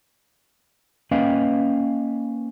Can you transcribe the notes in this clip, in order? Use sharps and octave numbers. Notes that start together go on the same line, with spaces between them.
A#3 C#4 B4 D#5 F5 G5